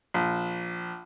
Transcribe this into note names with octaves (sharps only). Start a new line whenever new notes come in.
A#1